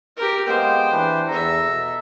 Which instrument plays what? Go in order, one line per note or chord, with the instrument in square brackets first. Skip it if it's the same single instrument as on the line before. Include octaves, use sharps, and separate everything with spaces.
[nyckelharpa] G4 A#4
[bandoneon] G#3 A#3 B3 [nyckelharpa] C5 [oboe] G5
[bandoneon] E3 D4 B4
[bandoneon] E2 [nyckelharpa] A4 E5 [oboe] A#5
[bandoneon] B2